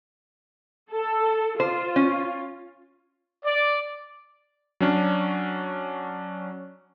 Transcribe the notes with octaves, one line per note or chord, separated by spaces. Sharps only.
A4
F4 C5
C#4
D5
F#3 C#4 D4